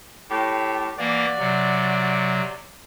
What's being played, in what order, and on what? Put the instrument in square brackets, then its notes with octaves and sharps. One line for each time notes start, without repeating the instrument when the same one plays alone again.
[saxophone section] A2 G4
[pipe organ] E3 A#3 [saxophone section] F#4 D5
[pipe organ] C3 F#3